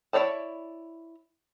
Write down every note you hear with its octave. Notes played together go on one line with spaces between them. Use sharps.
E4 G#4 C#5 D5 A5